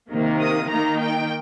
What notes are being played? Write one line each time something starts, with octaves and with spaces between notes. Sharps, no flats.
C3 D#3 A#3
D#6
D#3 A#3 D#4 A#5
G5